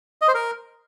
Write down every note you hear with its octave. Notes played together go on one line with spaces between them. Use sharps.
D#5
C5
A#4